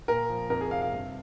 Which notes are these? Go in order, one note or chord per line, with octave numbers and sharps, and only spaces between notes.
A#2 A#4
F3
F2 A#4
G#4
C3 F5
F5
G2